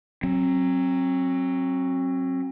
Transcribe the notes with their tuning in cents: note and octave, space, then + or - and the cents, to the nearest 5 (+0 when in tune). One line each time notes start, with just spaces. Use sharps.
F#3 +0 C4 +35